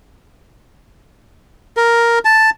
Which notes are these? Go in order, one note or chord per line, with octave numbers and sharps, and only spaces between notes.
A#4
A5